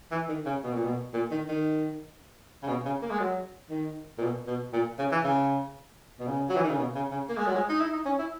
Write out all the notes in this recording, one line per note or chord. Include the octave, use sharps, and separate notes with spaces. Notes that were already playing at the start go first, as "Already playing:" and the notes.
E3
D#3
C#3
B2
A#2
B2
A#2
D#3
D#3
C#3
B2
C#3
A#3
G#3
F#3
D#3
A#2
B2
B2
A#2
C#3
E3
C#3
B2
C#3
F#3
E3
D#3
C#3
B2
C#3
C#3
A#3
G#3
F#3
G#3
D#4
E4
D#4
C#4
E4